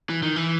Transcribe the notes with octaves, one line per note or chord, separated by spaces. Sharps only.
E3
D#3
E3